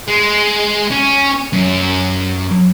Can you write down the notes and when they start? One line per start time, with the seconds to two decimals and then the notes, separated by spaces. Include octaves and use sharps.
0.08 G#3
0.91 C#4
1.53 F#2